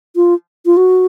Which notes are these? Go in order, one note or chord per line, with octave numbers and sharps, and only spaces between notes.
F4
F4
F#4